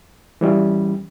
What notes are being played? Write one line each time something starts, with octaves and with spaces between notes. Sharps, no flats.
E3 G3 C#4